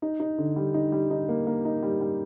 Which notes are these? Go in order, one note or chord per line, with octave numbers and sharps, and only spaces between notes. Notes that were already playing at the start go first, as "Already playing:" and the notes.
D#4
D#4
D3
G3
D#4
G3
D#4
A#3
A#3
D#4
G3
G3